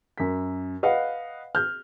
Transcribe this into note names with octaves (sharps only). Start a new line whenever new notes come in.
F#2 B6
B4 D#5 F5 F#5
F6 G6